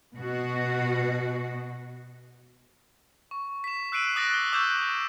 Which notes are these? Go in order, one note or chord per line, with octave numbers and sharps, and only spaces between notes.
B2 F#4
C#6
B6 E7
E6 F#6 C7 D7 D#7 F#7
D6 D#6 F#6 A6 A#6 D7
G7
C#6 D6 E6 F#6 G6 E7